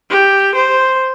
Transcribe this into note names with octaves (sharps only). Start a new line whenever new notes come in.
G4
C5